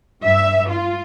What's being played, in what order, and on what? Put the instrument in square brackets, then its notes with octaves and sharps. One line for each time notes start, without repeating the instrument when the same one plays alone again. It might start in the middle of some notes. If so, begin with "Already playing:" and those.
[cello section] G2 E5
F4